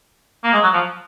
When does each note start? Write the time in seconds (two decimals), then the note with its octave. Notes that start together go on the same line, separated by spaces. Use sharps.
0.44 A#3
0.53 G#3
0.63 F#3
0.73 F3